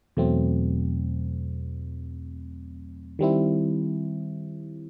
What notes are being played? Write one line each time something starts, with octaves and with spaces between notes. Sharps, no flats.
E2 B2 F#3 A3 C4
D#3 G3 C4 E4